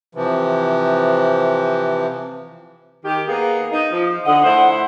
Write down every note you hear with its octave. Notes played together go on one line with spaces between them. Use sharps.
C3 E3 F3
D#3 G4
A#3 B3 G#4
D#4
F3
D3 D#5 F#5
A3 E4 C5